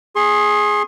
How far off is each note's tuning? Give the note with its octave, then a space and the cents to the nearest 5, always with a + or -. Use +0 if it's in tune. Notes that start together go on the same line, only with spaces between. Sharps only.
G#4 +0 C6 +40